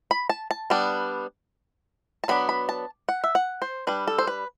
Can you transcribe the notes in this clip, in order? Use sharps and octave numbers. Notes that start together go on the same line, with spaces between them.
B5
A5
A5
G3 B3 D4
A5
F#3 B3 D4 B5
B5
A5
F#5
E5
F#5
C5
G3 D4 B4
A4
C5
B4